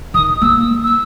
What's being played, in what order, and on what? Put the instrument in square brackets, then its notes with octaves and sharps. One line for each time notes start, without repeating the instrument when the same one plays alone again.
[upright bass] D#3 [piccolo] D#6
[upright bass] A#3 [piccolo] E6
[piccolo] E6